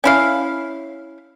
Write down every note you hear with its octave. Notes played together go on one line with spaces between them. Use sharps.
C#4 E4 F5